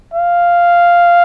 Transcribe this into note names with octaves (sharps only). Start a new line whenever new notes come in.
F5